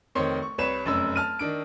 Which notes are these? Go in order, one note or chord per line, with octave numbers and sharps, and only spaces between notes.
F1 D#3 C4 C#5 C6
C#6
C2 B4 C#5 E7
F1 F#2 E6
A5 F6 D#7
D#3 D4 D7